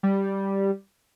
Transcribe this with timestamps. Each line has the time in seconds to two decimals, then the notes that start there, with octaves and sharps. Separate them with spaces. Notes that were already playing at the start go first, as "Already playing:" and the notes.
0.03 G3